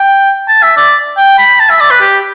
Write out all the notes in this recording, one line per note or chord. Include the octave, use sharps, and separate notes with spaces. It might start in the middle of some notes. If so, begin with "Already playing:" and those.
Already playing: G5
A5
E5
D5
G5
B5
A5
E5
D5
B4
G4